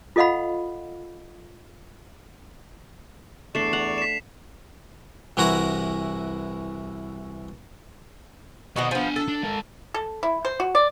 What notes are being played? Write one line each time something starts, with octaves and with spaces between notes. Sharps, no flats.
F4 A4 D#5 F5 F#5 B5
E2 A3 D4 D5 C#6 C7 E7
F#5 F7
B6 E7
C2 E3 E4 F#4 F#5 A#5
B2 B3 F#4 C5 D#5
F3 B3 D4 G#5
A4
D4
G#3 A#4
A4
E4
C5
F#4
D5